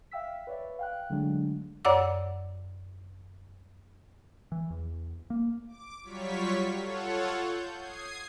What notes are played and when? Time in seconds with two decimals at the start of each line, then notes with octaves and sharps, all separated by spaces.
0.11 E5 F5 G5 E6 B6
0.47 B4 C#5 D5 E5
0.79 F5 G5 F#6
1.10 D3 F#3 G#3 A3 D4
1.85 F#2 C#5 D5 F#5 D6 E6
4.52 E3
4.70 E2
5.30 A#3
5.68 D6
6.04 F#3 G3 F4 C#5 C#6 B6
6.78 F4 A4 C#5 F#5
7.40 G6
7.76 D#6 G#6 C7